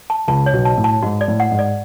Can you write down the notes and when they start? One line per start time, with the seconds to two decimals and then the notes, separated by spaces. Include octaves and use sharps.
0.10 A5
0.28 C#2 C#3 A5
0.46 C#5
0.53 B1 B2
0.65 A5
0.78 A2
0.84 A5
1.03 G#2 F#4
1.21 D5
1.28 A2
1.40 F#5
1.52 G#2
1.59 D5